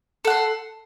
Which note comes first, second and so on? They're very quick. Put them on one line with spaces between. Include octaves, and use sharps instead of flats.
A4 F#5 C6